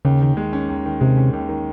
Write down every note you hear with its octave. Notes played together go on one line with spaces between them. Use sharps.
D#2 C#3
D#3
G#3
C#4
D#2
D#3
C3 G#3
C#4
D#2
D#3